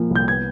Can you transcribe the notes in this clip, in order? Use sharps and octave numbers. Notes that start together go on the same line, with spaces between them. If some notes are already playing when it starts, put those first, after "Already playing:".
Already playing: A#2 F3 A#3
C2
G6
B3 G#6